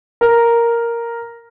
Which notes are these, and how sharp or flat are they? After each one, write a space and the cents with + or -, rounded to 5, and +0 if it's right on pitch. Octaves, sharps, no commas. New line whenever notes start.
A#4 +0